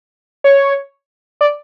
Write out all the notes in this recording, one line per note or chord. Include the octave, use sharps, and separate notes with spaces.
C#5
D5